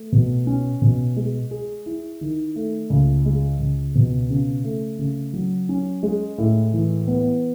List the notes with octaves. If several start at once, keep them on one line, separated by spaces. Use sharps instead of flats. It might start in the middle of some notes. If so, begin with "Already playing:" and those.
Already playing: A3
B2
C#4
B2
G#3
G#4
E4
D#3
A3
C#2
G#3
C#2
B2
C#3
A3
C#3
F#3
C#4
G#3
A2
E3
B3